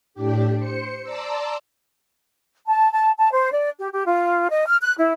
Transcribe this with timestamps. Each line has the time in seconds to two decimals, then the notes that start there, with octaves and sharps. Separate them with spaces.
0.14 A2 D4 G4
0.59 C5 C#7
1.03 D5 A5 A#5 C6 D6 E6
2.67 A5
2.92 A5
3.18 A5
3.32 C5
3.52 D5
3.79 G4
3.92 G4
4.06 F4
4.50 D#5
4.66 F6
4.81 F#6
4.98 E4